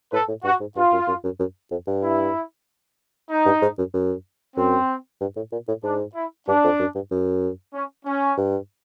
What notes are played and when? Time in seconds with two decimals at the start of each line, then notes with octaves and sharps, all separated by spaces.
0.12 A2 A4 B4
0.28 A2
0.44 G2 F#4
0.60 G#2
0.76 G2 F4
0.92 F#2
1.07 F#2
1.24 F#2
1.39 F#2
1.71 F2
1.87 G2
2.03 E4
3.30 D#4
3.45 G2
3.62 G#2
3.78 F#2
3.94 F#2
4.57 F#2 C4
5.21 G2
5.36 A2
5.52 A#2
5.68 A2
5.83 G#2 D4
6.15 E4
6.48 G2 D4
6.64 F2
6.79 F#2
6.95 G2
7.11 F#2
7.74 C#4
8.06 C#4
8.37 G2